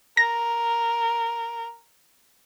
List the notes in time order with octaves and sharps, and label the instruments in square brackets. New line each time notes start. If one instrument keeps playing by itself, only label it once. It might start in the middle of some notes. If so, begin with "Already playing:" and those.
[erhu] A#4 [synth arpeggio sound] A#6